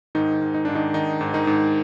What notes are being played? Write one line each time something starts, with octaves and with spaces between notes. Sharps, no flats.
G#2 D#3 D#4
G#2
D#4
G#2 D4
D#3 D#4
D#3 D#4
G#2
D#3 D#4
G#2